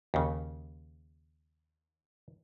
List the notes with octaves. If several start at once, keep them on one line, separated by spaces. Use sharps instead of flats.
D#2 C#3